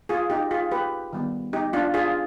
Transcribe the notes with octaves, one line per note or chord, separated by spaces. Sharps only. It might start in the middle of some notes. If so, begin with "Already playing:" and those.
F4 G#4
D#4 G4
F4 G#4
G4 B4
D#3 G3 B3
D#4 G4
D4 F4
F4 G#4